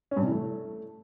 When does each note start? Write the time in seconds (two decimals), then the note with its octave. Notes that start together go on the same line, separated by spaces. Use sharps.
0.11 C#4
0.16 G2
0.21 C3
0.27 E3
0.32 A3